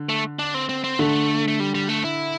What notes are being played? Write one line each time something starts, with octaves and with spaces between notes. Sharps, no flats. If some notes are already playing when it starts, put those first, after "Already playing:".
Already playing: D3
A3
D4
C4
C4
C4
D3 A3
A3
G3
G3
A3
E4